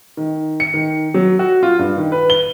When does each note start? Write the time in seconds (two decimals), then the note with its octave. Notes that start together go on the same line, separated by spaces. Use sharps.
0.17 D#3
0.60 C#7
0.74 D#3
1.14 F#3
1.39 F#4
1.63 F4
1.79 G2
1.97 D#3
2.12 B4
2.30 G7